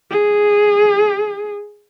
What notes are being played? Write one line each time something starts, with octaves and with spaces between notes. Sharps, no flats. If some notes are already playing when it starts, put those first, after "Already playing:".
G#4